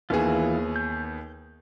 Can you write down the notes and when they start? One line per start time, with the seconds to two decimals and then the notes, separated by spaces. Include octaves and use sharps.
0.10 D#2 E3 B3 F4 G#4
0.76 G6